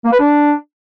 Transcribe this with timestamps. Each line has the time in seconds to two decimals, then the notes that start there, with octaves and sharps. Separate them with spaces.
0.05 A#3
0.13 B4
0.20 D4